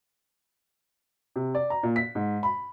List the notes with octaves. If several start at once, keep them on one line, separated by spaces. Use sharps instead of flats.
C3
D5
A#5
A#2
B6
G#2
B5